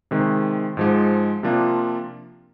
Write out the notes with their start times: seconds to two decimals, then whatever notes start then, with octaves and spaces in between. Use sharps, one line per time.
0.11 C3 D#3 G#3
0.77 G#2 F3 G#3
1.43 C3 F3 A#3 D4 F4